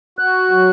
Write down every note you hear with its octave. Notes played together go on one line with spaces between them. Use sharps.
F#4 F#6
F#3